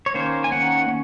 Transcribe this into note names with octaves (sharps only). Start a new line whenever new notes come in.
C#5
D#3 A#3 C#4 C5
G#5
D#3 A#3 C#4 F#5
C#4